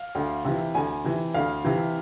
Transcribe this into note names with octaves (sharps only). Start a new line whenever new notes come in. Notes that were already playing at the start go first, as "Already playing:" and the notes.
Already playing: F5
D2
C3 E3
D2 G#5
C3 E3
D2 F5
C3 E3